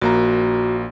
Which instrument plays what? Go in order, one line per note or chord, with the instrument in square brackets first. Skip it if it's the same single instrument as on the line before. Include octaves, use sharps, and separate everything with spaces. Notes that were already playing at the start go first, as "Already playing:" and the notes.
[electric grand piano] A#1 A#3 A#5 [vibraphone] F#4